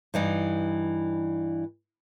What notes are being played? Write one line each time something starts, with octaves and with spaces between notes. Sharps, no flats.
G2 E3 D#4